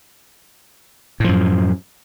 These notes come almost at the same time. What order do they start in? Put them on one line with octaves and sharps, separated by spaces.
A2 F3 F#2